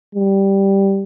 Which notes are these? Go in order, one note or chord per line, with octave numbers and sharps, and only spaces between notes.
G3